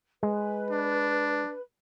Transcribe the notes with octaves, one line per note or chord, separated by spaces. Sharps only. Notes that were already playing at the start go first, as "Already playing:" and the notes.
G#3 B4
D4